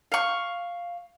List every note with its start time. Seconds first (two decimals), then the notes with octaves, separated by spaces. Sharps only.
0.12 F5 C#6